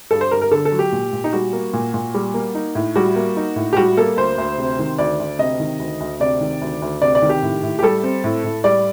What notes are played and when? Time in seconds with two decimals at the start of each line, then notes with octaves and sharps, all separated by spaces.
0.11 G2 A4
0.21 C5
0.31 G2 A#4
0.41 A#4
0.51 D3 A4
0.65 A4
0.72 F#3
0.79 G4
0.92 A#2
1.13 A#2
1.24 D#4
1.33 G3 F#4
1.53 A#3
1.73 A#2
1.94 A#2
2.14 G3
2.34 A#3
2.55 D#4
2.75 A2
2.96 G3 F#4
3.16 A#3
3.37 D#4
3.56 A2
3.73 G4
3.77 G3 F#4
3.97 A#3 A4
4.17 D2 C5
4.38 D2
4.58 C3
4.79 D#3
4.98 D2 D5
5.20 D2
5.39 C3 D#5
5.60 D#3
5.79 D2
6.00 D2
6.20 C3 D5
6.41 D#3
6.61 D2
6.82 D2
7.02 C3 D5
7.15 D5
7.22 D#3
7.29 G4
7.42 A2
7.63 A2
7.79 G4
7.83 G3 A4
8.03 C4
8.24 A2
8.44 A2
8.64 G3 D5